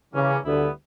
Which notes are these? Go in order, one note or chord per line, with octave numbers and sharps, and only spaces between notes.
C#3 E3 G3 A#3 C#4
D2 D3 G3 B3 E4